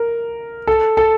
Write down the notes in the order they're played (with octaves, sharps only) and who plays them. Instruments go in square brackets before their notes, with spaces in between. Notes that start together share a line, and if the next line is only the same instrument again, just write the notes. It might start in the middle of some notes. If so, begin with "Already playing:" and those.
Already playing: [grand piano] A#4
A4
A4